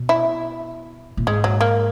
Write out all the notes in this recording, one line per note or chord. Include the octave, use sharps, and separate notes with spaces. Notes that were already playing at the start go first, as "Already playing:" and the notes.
Already playing: B2
E4
A#2
G#2 G#3
F#3
A#3